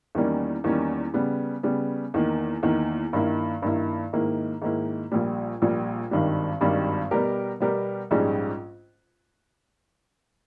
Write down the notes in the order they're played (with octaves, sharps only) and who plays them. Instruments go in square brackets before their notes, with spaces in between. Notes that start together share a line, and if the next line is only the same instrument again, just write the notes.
[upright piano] E2 D#3 G3 A#3 C#4
E2 D#3 G3 A#3 C#4
C#3 G3 B3
C#3 G3 B3
E2 D#3 A#3
E2 D#3 A#3
G2 D#3 A#3 E4
G2 D#3 A#3 E4
G#2 D#3 A#3 E4
G#2 D#3 A#3 E4
A#1 A#2 G3
A#1 A#2 G3
G#1 G2 D#3 G3
G#1 G2 D#3 G3
B2 G3 B3 G4 A#4
B2 G3 B3 G4 A#4
A#1 G#2 G3 C#4 G#4